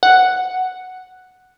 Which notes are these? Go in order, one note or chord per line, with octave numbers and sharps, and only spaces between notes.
F#5